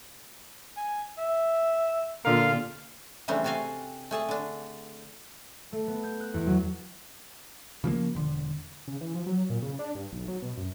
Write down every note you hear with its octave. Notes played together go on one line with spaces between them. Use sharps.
G#5
E5
A#2 D3 F4 A#4 F5
C#3 E3 G3 A3 C4 D4
C3 F#4 A4 F5 G#5
A3 G#4 A5
D3 D4
A3
B3
G6
F#6
E2
F#3
C#3 F3 G#3 A#3
E1 D3
C#3
E3
F3
F#3
A#2
C#3
D4
G2
B1
F#3
B2
F#2